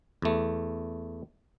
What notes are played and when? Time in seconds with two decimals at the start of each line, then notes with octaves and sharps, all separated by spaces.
0.22 E2 A3